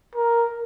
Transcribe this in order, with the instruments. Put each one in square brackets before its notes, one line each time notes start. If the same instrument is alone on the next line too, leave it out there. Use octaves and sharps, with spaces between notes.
[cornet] A#4